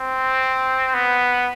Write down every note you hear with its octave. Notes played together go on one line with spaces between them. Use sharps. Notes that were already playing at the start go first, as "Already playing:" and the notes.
Already playing: C4
B3